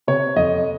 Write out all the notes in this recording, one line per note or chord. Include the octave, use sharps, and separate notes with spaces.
C3 C#5
F2 D#5